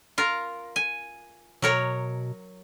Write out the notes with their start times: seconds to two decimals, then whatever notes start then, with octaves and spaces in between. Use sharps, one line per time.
0.18 F4 A#4
0.76 G#5
1.62 B2 F#3 A#4 C#5